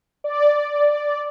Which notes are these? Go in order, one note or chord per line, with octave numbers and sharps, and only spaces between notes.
D5